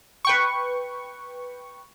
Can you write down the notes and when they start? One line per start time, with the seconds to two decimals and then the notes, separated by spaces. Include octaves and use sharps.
0.25 B4 G5 C#6